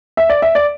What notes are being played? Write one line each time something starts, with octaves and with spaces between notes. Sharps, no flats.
E5
D5
E5
D5